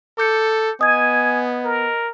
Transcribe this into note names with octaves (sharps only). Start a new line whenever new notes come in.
A4 D6 G6 C#7
B3 D#5 G#5 D#6 G#6
A#4